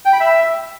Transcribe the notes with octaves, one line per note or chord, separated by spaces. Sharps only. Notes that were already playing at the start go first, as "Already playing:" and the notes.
G5
B5
E5